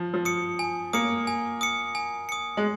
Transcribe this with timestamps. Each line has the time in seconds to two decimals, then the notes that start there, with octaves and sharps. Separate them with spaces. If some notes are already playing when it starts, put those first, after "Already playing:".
Already playing: F3
0.14 F3
0.25 D#6 C#7
0.59 G#5
0.93 A#3 D#6 C#7
1.27 G#5
1.61 D#6 C#7
1.95 G#5
2.29 D#6 C#7
2.57 G#3